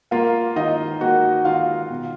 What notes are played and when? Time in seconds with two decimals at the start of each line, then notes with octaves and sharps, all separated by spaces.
0.11 A#3 F4 F5
0.56 D#3 D#4 D#5
1.01 A#3 F#4 F#5
1.45 D#3 F4 F5
1.90 B2